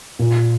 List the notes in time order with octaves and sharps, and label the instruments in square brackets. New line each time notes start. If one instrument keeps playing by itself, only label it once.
[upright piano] A#2